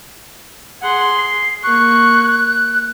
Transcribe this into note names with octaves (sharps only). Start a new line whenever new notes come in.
G#4 F#5 C6
C7
A#3 C#6 F#6